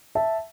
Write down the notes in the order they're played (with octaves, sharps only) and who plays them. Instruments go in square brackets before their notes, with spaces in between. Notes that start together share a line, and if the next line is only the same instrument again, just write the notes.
[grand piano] E5 A5